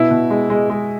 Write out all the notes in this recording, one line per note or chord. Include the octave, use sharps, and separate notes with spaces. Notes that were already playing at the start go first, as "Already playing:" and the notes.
Already playing: B2 E4
B2
G#3
G#3
G#3